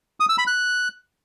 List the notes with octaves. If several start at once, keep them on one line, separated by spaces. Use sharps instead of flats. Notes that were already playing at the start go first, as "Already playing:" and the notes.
D#6
E6
B5
F#6